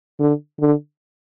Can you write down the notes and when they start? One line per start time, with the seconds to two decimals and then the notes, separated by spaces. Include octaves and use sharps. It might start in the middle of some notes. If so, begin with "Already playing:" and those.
0.20 D3
0.60 D3